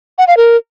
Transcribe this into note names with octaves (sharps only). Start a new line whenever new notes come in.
F#5
F5
A#4